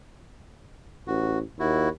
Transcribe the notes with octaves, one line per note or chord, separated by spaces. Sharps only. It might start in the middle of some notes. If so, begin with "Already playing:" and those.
A1 F#4
D#2 E4 F#4